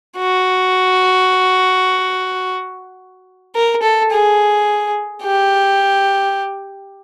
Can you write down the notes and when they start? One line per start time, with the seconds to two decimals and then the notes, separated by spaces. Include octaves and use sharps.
0.18 F#4
3.55 A#4
3.83 A4
4.12 G#4
5.23 G4